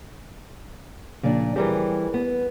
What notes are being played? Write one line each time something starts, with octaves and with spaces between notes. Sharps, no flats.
A#2 C#3 F3 D4
E3 G3 C4 G4 G#4 A#4
B3